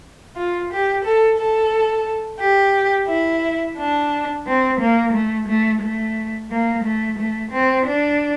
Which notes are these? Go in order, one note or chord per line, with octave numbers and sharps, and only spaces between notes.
F4
G4
A4
A4
G4
E4
D4
C4
A#3
A3
A3
A3
A#3
A3
A3
C4
D4